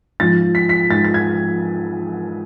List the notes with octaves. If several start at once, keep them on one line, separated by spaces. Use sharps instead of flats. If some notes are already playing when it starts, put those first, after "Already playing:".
G#2 F3 A6
B6
B6
G#2 F3 A6
A6
G#6